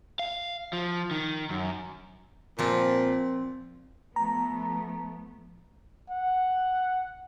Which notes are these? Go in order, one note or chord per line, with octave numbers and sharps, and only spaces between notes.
F5
F3
D#3
F#2
A#2 F3 C4
F3 A3 B3 A#5
F#5